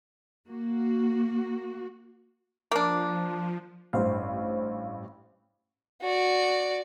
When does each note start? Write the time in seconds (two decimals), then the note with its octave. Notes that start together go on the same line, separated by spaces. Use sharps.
0.48 A#3 F#4
2.71 F3 A#3 D4
3.93 A1 G2 C5 F5
6.01 F#4 D5